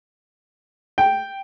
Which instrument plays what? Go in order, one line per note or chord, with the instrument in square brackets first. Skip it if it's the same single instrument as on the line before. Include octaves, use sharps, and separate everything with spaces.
[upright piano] G5